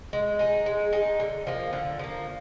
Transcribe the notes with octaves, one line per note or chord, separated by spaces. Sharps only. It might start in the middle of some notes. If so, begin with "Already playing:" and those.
G#3
D#4 G#4
G#3
D#4 G#4
D3
F3 A#3
D3
F3 A#3